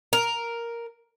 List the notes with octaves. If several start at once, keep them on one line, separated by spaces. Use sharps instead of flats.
A#4